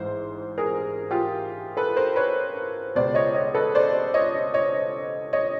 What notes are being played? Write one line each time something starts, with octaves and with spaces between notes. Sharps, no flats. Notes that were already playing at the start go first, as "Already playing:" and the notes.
Already playing: A1 G#2 E3 C5
G#4 A#4
F4 G4
A4 B4
A#4 C5
B4 C#5
C#2 B2 C5 D5
C#5 D#5
C#5 D#5
A4 B4
C5 D5
C#5 D#5
C#5 D#5
C#5 D#5